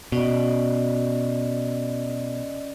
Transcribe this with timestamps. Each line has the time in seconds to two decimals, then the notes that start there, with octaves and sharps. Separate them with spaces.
0.12 B2 C#4 D5 D#5